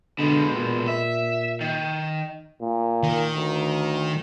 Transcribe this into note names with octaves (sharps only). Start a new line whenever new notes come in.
B2 D3 G#3
A#2
E5
D#3
A#2
D#3
D2